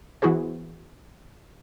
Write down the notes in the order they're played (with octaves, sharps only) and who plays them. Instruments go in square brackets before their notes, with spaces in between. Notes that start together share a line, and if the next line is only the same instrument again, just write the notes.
[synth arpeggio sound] E3 B3 E4 F#4 G#4 C5